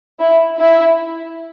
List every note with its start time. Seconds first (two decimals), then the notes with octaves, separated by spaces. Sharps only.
0.20 E4
0.59 E4